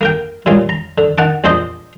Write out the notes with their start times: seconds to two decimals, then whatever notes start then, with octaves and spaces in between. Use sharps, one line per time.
0.01 A#3 A#4 G5
0.46 A#2 C#3 G3 G#3 F4
0.69 A#5
0.98 D3
1.18 D#3 F#5 A5 D6
1.44 A#1 E2 F3 D4 C5 D#5